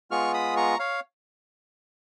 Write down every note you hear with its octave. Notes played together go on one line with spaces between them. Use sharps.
G#3 B3 F4 C#6 F6
B5 D#6
A#5 C#6
C#5 F5